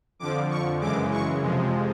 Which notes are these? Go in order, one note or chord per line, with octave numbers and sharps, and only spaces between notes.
F2 D3 F3 D6
C#6
F#2 C#3 E3 G#3 D6
C#6
F2 C3 F3 G#3